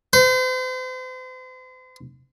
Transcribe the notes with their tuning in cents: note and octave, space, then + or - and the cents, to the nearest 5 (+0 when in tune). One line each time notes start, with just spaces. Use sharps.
C5 -40